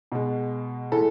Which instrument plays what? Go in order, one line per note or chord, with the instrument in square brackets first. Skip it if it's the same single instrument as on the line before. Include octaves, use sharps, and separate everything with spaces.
[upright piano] B2 G#3
A2 E3 G#3 A4